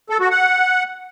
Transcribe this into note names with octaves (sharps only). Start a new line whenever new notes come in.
A4
F#4
F#5